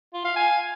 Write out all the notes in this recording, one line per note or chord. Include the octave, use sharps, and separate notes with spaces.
F4
F5
G#5